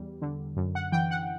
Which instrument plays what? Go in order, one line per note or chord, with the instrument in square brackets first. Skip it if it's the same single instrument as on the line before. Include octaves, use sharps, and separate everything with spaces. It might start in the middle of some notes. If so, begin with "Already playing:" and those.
Already playing: [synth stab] E2 G3
D3
F#2
F#5
E3 G5
F#5